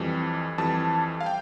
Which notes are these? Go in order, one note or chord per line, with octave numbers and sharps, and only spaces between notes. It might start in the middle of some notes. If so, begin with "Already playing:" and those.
Already playing: F2 E3 G3
F2 E3 G3 A5
F5
G5